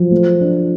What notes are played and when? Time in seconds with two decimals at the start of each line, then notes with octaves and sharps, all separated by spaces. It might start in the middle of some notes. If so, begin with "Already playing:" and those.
Already playing: F3 F#3
0.11 A3
0.41 D4